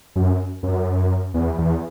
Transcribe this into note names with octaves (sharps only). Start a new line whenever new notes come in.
F#2
F#2
E2
E2